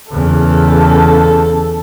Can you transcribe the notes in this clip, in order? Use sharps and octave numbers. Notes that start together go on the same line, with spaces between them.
E2 C#3 A4